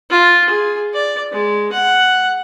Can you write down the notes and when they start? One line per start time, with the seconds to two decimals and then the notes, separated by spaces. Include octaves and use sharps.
0.11 F4
0.49 G#4
0.94 D5
1.32 G#3
1.72 F#5